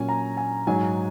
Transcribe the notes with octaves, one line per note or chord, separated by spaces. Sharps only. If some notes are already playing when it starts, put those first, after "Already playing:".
Already playing: A#2 F#3 C#4 G#5
A#5
G#5
G#2 F#3 D#4 G#5